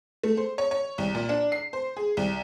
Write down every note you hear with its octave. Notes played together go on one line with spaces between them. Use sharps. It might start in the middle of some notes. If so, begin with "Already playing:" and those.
A3
C5
C#5
C#5
C2
A#2
D4
C7
C5
G#4
C2